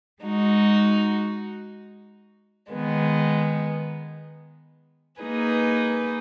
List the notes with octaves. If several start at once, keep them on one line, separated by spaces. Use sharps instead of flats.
G#3 D#4 F#4
D#3 G#3 B3
A#3 D#4 G#4 B4